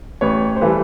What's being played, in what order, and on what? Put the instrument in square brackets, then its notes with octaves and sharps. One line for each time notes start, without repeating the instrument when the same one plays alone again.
[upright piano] A1 B4 C#5
C5
E3 G3 A4 B4